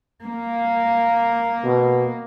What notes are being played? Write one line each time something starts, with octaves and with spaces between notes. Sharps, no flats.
A#3
B2